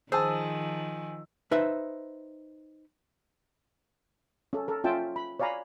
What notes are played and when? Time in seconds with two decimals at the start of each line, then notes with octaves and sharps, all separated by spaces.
0.12 D#3 F3 G#4 C5 A5 E6
1.51 D#4 B4 C5 E5
4.53 C#4 A4
4.68 A4 A#4
4.84 C#4 F4 E5 G5 A5
5.16 B5
5.39 C#5 D5 F5 G#5 A#5 B5